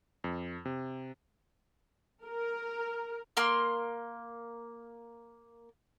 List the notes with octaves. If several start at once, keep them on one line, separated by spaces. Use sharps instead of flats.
F2
C3
A#4
A#3 C6 F6